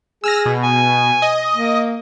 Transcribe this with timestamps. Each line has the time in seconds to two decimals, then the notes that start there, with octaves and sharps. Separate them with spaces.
0.24 G#4 E6 F6 A#6
0.46 B2
0.62 G#5
1.22 D#5
1.55 A#3